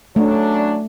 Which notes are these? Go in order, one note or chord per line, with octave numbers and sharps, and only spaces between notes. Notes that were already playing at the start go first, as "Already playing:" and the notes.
F#3 A3 C#4 D4